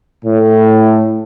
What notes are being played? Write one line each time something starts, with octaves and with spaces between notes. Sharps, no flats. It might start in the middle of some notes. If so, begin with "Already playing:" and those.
A2